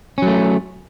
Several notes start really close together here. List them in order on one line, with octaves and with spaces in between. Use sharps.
C#4 F#3 A3